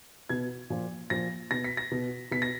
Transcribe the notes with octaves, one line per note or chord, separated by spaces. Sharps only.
B2 G#6
A#2 F3
A#2 F3 A#6
B2 A#6
B6
A#6
B2
B2 B6
A#6